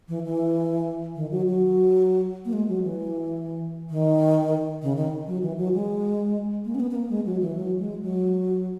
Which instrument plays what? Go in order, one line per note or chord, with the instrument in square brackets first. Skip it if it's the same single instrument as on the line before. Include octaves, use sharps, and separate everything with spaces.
[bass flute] E3
E3
D#3
F#3
F#3
A#3
G#3
F#3
E3
D#3
C#3
D#3
F#3
E3
F#3
G#3
A#3
C#4
B3
B3
A#3
G#3
F#3
E3
F#3
G#3
F#3